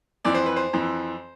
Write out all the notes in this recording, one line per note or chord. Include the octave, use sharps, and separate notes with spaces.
F2 E3 D5
C5
B4
C5
F2 E3